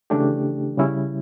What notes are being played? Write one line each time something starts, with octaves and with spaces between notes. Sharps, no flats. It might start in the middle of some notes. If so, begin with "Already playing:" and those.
C#3 E3 A3 D4 G4
C#3 G3 C#4 E4